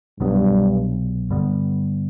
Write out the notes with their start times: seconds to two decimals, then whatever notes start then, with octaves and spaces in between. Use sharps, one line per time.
0.20 C2 G2 B2 F#3 B3
1.30 G2 D3 G3 B3